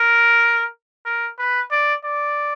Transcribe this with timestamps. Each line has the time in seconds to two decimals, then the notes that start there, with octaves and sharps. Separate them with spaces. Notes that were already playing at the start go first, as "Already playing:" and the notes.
Already playing: A#4
1.06 A#4
1.38 B4
1.71 D5
2.04 D5